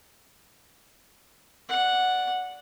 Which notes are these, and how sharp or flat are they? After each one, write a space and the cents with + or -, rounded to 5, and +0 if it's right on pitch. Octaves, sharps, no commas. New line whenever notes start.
D5 -10 F#5 -5